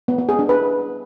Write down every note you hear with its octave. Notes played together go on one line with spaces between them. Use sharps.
B3
B3
G#4
D4
B4